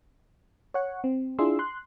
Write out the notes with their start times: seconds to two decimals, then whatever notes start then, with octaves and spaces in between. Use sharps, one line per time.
0.74 C#5 F#5
1.04 C4
1.39 D4 E4 F4 G#4 C6 E6
1.59 C6 F#6